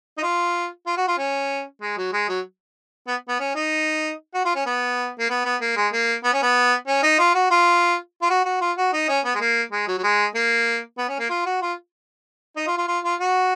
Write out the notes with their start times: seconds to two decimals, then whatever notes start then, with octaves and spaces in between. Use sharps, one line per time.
0.17 D#4
0.23 F4
0.86 F4
0.97 F#4
1.07 F4
1.18 C#4
1.81 G#3
1.97 F#3
2.13 G#3
2.29 F#3
3.07 B3
3.28 B3
3.39 C#4
3.55 D#4
4.34 F#4
4.45 F4
4.55 C#4
4.66 B3
5.19 A#3
5.29 B3
5.45 B3
5.61 A#3
5.76 G#3
5.92 A#3
6.24 B3
6.33 C#4
6.42 B3
6.87 C#4
7.03 D#4
7.19 F4
7.34 F#4
7.50 F4
8.22 F4
8.30 F#4
8.45 F#4
8.61 F4
8.77 F#4
8.93 D#4
9.08 C#4
9.25 B3
9.35 G#3
9.40 A#3
9.72 G#3
9.88 F#3
9.98 F#3
10.03 G#3
10.35 A#3
10.98 B3
11.08 C#4
11.19 A#3
11.30 F4
11.46 F#4
11.62 F4
12.56 D#4
12.67 F4
12.77 F4
12.88 F4
13.04 F4
13.20 F#4